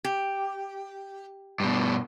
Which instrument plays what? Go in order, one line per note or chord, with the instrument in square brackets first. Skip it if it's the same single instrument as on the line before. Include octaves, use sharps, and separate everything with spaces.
[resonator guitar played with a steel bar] G4
[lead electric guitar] G2 B2